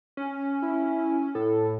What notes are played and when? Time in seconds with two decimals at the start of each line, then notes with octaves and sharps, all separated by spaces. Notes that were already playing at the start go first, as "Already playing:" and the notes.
0.17 C#4
0.62 E4
1.35 A2 A4